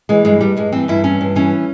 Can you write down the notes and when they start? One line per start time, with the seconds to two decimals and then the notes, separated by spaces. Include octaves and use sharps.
0.09 E3 G#3
0.25 G2 G#3
0.40 G2 G3
0.57 G2 G#3
0.72 E3 C4
0.88 G2 E4
1.04 E3 C#4
1.21 G2
1.36 E3 C#4